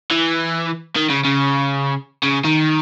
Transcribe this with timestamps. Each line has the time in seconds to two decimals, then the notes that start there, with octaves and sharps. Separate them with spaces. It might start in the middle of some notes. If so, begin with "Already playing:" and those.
0.11 E3
0.96 D#3
1.10 C#3
1.25 C#3
2.23 C#3
2.45 D#3